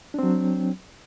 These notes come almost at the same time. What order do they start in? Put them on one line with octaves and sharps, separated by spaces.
D4 C4 F#3